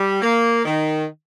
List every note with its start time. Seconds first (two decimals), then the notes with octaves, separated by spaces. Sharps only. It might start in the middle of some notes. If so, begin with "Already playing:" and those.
Already playing: G3
0.21 A#3
0.65 D#3